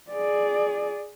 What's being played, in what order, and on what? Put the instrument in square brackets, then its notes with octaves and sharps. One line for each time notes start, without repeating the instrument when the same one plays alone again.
[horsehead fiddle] G#4 D5